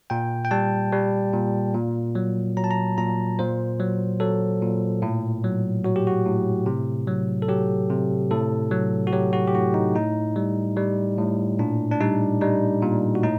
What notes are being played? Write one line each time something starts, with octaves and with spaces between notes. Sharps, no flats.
A#2 G5
G5
G3 A5
G3
A#2
A#2
F#3
F#3 A#5
A5
A#5
A#2 A#5
A#2 C5
F#3
F#3 A4
A#2
A2
F#3
F#3 F#4
G4
F#4
A2
C3
F#3
A4
F#3 G4
C3
A2 A4
F#3
F#4
F#3 G4
F#4
G4
A2 F#4
D#4
A2 D#4
G3
G3
A2
A#2 D4
D4
G3 D#4
G3 D#4
A#2
F#4
A2 D#4